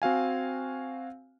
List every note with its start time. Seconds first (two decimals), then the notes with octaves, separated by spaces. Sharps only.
0.02 C4 F#4 F5 G#5